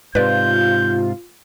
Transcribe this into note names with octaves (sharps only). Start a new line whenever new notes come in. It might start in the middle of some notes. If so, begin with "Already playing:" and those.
G#2 C3 F4 B4 D5 G6